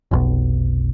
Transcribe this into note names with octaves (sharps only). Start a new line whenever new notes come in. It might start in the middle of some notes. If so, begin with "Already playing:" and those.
F1 B1